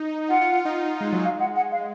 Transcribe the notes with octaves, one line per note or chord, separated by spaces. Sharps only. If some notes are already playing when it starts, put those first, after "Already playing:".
Already playing: D#4
F4 F#5
F4
F4
D#4
F4
G#3
F#3
G#3 F5
F#5
F#5
F5